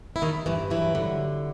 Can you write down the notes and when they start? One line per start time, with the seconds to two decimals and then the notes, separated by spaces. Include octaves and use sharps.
0.16 E4
0.22 G2 D#3 D#4
0.46 G2 E3 E4
0.70 E3 F#3 E4
0.95 D3